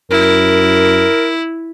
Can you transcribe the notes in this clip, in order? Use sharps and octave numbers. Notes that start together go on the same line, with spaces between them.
F#2 E4 A#4